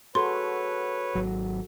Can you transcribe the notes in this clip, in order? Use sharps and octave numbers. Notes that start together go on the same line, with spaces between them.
F#4 G#4 A4 B4 C#5 C6
G#1 F#3